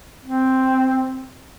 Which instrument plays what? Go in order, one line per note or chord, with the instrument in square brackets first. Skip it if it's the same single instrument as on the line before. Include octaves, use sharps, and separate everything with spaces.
[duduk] C4